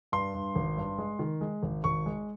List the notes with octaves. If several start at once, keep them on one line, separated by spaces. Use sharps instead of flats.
G2 C6
G2
G#1
G2
G#3
D#3
G#3
G#1
G#1 C#6
G#3